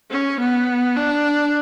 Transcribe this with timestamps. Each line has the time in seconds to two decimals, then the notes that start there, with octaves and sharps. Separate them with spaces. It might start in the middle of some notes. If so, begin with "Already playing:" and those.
0.11 C#4
0.39 B3
0.96 D4